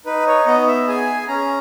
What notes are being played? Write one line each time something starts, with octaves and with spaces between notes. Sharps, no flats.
D#4 B4
C#5
B3 D#5
E5
G#4 G#5
C#4 A#5